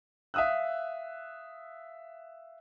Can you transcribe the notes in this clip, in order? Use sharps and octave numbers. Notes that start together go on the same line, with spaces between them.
E5 F5 D#6 E6 F#6